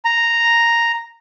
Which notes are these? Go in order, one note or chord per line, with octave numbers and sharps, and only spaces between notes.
A#5